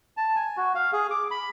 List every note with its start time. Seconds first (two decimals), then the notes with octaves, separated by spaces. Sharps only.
0.17 A5
0.36 G#5
0.57 F#4
0.75 F5
0.93 G#4
1.10 D6
1.31 B5